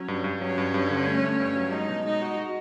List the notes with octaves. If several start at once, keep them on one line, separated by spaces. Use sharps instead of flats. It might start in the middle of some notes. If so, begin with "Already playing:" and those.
Already playing: F#3 C#4
G2
G2
F#3 C#4
G2
G2
D3
A3
A3
G2
F#3
G#3 D#4
B2
G#3 D#4
F#4
F#4